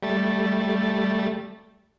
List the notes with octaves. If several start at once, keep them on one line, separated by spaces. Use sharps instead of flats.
G3 A3 A6